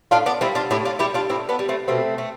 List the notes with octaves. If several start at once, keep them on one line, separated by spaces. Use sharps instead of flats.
A2 D4 F4
B3 D4
G3 C4 E4
D4 F4
A2 E4 G4
D4 F4
G3 E4 G4
D4 F4
A2 C4 E4
B3 D4
G3
A3 C4
B2 A3 C4
A3